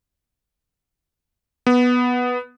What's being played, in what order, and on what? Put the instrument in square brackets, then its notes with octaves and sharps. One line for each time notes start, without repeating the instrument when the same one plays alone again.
[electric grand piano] B3